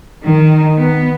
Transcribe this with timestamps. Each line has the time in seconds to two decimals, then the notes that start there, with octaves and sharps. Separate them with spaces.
0.25 D#3
0.79 B3